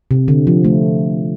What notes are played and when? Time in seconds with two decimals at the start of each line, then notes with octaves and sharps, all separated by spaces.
0.11 C3
0.28 D3
0.47 F3
0.65 A3